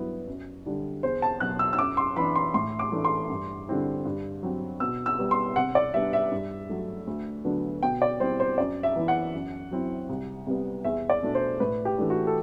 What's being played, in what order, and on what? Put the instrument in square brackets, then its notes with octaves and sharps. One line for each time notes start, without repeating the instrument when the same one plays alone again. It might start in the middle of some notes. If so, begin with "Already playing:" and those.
Already playing: [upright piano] G2 F#3 B3 E4
F#2
D3 G3 D4
E2 C5
A5
B2 F#3 F#6
E6
E6
F#2 D6
C6
E3 B3 D4 B5
C6
A2 C6
D6
E3 A3 D4
C6
G2
D3 G3 C4 E4
G2
F#3 C4
B2 E6
E6
G3 B3
C6
C3 F#5
D5
G3 B3 D4 E5
E5
G2
F#3 A3
D2
D3 F#3 B3 D4
B2 G5
D5
G3 C4 E4 C5
C5
F#2 D5
E5
E3 B3 E4
F#5
F#2
F#3 C4 E4
C2
C3 G3 B3
E2 E5
D5
B2 A3 D4
C5
A2 B4
G4
E3 A3 D4
F#4
A4